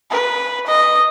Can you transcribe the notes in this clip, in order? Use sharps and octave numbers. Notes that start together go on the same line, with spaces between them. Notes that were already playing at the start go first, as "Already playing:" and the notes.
B4
D#5